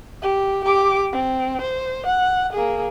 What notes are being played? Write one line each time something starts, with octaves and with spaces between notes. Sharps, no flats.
G4
G4 D6
C4
C5
F#5
A#3 G#4